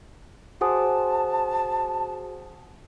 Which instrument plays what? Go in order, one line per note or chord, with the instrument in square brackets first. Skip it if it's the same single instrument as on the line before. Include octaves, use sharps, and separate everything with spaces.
[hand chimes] F#4 G#4 C5 [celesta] F#5 G#5 D#6 [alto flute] A5